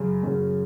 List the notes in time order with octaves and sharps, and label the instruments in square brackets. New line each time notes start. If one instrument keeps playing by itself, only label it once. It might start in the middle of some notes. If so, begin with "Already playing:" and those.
Already playing: [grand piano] F#2 C#3 F#3 C#4
F#2 C#3 F#3 C#4